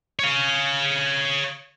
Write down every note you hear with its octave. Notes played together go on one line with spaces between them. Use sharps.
C#5 F5